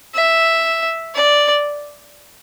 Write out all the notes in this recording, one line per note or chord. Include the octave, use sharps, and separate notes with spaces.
E5
D5